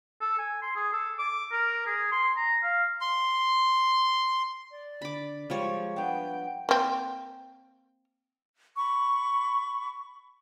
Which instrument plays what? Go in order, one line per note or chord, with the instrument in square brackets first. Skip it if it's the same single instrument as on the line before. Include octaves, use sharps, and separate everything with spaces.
[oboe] A4
G#5
C6
G#4
A4
D6
A#4
G#4
C6
A#5
F5
[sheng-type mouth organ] C6
[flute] D5
[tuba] D3 [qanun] B5 D6
[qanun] F3 G3 C#5 [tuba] G#3
[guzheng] B3 D4 [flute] G5
[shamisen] A#3 C4
[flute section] B5 C#6